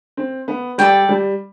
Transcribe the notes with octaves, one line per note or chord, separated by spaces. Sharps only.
C4
B3
G3 A4 D5 G5
G3